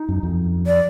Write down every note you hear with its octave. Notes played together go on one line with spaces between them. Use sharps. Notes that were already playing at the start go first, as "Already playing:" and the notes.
Already playing: D#4
F#2
F2
D5